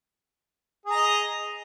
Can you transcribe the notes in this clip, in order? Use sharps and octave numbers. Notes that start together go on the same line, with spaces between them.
G#4 D#5 A#5